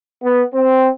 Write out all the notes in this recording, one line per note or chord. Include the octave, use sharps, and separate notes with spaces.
B3
C4